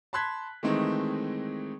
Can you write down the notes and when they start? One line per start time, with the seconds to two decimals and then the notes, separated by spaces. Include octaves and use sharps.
0.13 A5 B5 C6 F#6 G#6 B6
0.63 D#3 E3 G#3 A3 C4 D#4